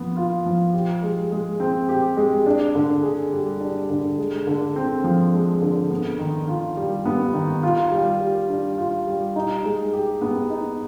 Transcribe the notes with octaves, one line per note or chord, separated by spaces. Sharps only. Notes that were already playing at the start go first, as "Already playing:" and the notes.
Already playing: F3 B3
F4
F3
G4
G#3
G#3
C4
G4
G#3
D4
D3
G#4
G3
D4
D3
G#3
D3
C4
F3
G#3
D3
B3
D#3
F4
G3
B3
D#3
F4
G3
G3
D4
F4
G3
D#4
G#3
G4
B3
D#4